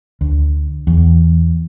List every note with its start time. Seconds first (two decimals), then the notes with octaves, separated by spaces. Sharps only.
0.21 D2
0.87 E2